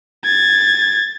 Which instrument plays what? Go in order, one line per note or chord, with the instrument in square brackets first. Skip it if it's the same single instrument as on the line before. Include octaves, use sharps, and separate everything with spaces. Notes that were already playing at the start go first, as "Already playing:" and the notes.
[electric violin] G#6 A6